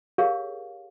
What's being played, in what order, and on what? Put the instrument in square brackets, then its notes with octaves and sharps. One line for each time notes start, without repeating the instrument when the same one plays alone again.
[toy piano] G4 G#4 A#4 C#5 F5